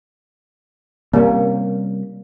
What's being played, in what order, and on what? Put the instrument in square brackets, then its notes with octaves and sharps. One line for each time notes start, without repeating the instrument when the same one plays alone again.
[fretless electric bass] C3 G3 C#4 [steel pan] A#3